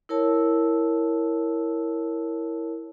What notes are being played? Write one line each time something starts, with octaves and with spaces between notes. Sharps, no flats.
E4 A#4 C#5 A5 E6